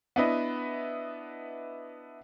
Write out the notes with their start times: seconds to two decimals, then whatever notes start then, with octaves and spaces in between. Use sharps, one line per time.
0.16 B3 D4 E4 B4 D#5